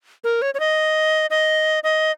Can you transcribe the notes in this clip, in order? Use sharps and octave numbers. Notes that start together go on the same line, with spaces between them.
A#4
C#5
C#5
D#5
D#5
D#5